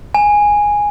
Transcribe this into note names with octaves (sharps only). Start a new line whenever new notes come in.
G#5